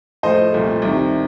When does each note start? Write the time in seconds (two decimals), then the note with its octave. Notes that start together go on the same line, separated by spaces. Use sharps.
0.23 A2 F3 A3 C5 D#5
0.52 C2 A#2 F3 A3
0.82 C2 C3 D#3